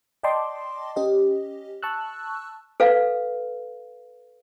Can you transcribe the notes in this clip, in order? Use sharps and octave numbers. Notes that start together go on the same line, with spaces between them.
D5 D#5 G5 A5 C6 D6
C#4 G4 D#5
A5 C#6 E6 F#6
A4 B4 F5